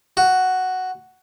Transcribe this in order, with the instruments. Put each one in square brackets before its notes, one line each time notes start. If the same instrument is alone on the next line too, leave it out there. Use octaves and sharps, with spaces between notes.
[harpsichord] F#4